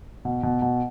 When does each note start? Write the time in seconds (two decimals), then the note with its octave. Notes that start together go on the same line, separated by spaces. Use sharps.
0.25 B2
0.43 B2
0.62 B2